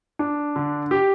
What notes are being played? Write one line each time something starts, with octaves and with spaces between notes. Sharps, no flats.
D4
D3
G4